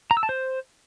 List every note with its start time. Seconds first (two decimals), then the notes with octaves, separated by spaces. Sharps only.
0.11 A#5
0.17 E6
0.23 A5
0.29 C5